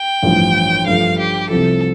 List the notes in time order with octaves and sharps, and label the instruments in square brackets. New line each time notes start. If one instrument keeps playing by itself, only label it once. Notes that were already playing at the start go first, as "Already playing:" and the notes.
Already playing: [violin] G5
[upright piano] A1 G2 F3
[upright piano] G2 F3 A3 F4 [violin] F5
[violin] G4
[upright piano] C2 C3 F3 [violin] A4